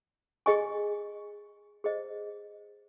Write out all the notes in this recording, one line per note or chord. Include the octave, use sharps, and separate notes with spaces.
G#4 D#5 G#5 C#6
G#4 C5 D#5